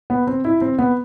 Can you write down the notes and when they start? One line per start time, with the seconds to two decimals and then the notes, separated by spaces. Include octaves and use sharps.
0.10 B3
0.27 C4
0.45 E4
0.61 C4
0.79 B3